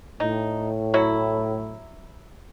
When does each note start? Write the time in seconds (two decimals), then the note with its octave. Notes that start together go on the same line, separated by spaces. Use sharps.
0.20 A2 D#4
0.94 F#3 E4